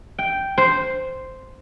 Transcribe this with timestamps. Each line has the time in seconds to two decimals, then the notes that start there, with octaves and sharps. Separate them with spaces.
0.19 G5
0.58 C5